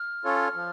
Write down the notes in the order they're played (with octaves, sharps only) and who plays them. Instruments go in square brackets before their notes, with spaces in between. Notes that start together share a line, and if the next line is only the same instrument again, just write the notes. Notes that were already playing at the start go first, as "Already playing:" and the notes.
Already playing: [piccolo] F6
[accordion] C#4 F4 A4 C#5
F3